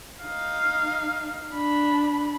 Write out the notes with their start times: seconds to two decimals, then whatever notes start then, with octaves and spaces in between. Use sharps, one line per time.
0.23 D#4 F5
1.51 D4 B5